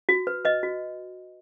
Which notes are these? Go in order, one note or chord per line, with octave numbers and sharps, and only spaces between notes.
F#4
B4
B4 D#5
F#4